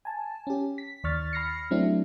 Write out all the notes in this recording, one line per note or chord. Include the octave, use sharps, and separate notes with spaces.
G#5 A5
C#4 G4
B6
D#2 D#3 D5 C#6 F6 A6
B5 F6 A#6 C7 C#7
F#3 A3 C4 D4 E4